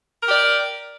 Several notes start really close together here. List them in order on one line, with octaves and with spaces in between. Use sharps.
A#4 G4 D5